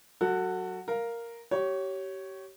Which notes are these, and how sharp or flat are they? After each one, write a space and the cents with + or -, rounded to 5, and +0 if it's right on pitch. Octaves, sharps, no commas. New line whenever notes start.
F#3 +0 F#4 +0 A4 +30
A#4 +0 F5 +0
G4 -30 C#5 +0